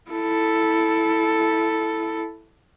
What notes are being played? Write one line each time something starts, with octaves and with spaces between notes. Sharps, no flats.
E4 A4